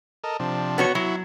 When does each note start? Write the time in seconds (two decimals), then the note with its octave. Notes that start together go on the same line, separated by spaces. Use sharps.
0.24 A4 A#4 D#5
0.40 C3 F3 D4
0.78 B3 F#4 C#5
0.95 F#3 E4 F#4